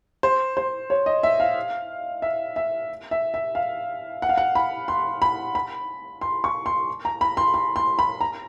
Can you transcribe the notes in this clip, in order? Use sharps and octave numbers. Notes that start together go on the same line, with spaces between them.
C5
C5
C#5
D#5
E5
F5
E5
E5
E5
E5
F5
F#5
F5
F#5
B5
C6
B5
B5
C6
C#6
C6
A#5
B5
C6
C6
C6
B5
A#5